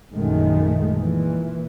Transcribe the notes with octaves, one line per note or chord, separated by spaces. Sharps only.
A#1 F#2 D#3 G#3 A3
A#2 E3